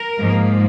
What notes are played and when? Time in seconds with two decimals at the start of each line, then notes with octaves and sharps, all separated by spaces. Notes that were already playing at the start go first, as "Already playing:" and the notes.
Already playing: A#4
0.18 G#2 F3 A#3